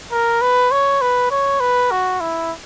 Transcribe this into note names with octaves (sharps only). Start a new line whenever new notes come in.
A#4
B4
C#5
B4
C#5
B4
F#4
E4